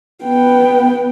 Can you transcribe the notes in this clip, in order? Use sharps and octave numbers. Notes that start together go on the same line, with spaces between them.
B3 G5